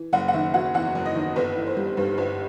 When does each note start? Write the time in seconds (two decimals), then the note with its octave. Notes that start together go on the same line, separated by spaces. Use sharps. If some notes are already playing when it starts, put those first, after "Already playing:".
Already playing: E3
0.13 F#1 F#5
0.28 F#5
0.33 D#3 E5
0.54 F#3 F#5
0.74 E2 F#5
0.95 F#1
1.05 D#5
1.15 D#3
1.36 G1 B4
1.56 E3
1.67 C5
1.77 G3
1.97 G2 B4
2.17 G1 B4